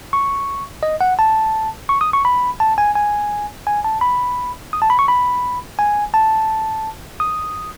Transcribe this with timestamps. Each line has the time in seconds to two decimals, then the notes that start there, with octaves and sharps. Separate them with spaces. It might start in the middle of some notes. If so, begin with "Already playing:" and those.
0.13 C#6
0.83 D#5
1.01 F#5
1.19 A5
1.89 C#6
2.01 D#6
2.13 C#6
2.25 B5
2.60 A5
2.78 G#5
2.95 G#5
3.67 G#5
3.84 A5
4.01 B5
4.73 D#6
4.82 A5
4.90 B5
4.99 C#6
5.08 B5
5.79 G#5
6.14 A5
7.20 D#6